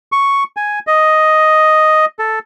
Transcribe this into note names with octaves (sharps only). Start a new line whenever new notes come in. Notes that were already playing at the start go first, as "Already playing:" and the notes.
C#6
G#5
D#5
A4